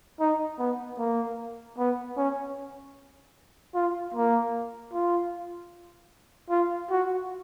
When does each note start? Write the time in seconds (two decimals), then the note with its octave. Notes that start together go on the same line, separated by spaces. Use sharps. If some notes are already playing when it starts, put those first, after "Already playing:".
0.20 D#4
0.59 B3
0.99 A#3
1.78 B3
2.17 C#4
3.75 F4
4.14 A#3
4.93 F4
6.51 F4
6.91 F#4